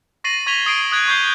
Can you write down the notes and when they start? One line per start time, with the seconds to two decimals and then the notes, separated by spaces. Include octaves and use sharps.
0.24 C#6 A6 A#6 C7 D#7 F#7
0.47 C#6 G#6 B6 D#7 F7 G7
0.66 D#6 G#6 C7 D7 D#7 F7
0.92 D#6 F#6 G#6 D7
1.08 C#6 G6 C7 G7